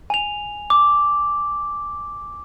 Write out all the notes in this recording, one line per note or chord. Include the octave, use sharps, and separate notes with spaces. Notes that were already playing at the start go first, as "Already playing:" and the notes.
G#5 F7
D6